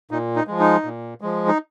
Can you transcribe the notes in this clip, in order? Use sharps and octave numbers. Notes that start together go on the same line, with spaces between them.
A#2 D#4
D#4
F3 G#3
D#4
A#2
F3 G#3
D#4